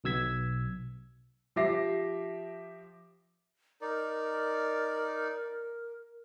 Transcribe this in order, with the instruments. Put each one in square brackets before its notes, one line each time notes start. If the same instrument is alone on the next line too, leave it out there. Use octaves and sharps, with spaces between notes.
[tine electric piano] B1 B2 E6 G#6 B6
[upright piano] F3 G4 E5 D6 A#6 C7
[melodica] D#4 D5 [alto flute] A#4